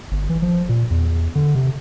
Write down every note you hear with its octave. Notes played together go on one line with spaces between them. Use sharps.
G1
E3
F3
A#2
E2
D3
C3